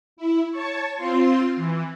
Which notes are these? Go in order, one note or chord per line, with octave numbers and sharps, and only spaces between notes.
E4
C#5 A5 C#6
C4 F4 C6
E3